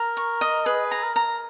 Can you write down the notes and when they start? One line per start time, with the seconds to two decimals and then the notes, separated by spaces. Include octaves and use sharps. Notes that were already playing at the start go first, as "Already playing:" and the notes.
Already playing: A#4 A#5
0.17 C#6
0.41 D#5
0.65 G#4 B4
0.91 A#5
1.03 A#4
1.16 A#5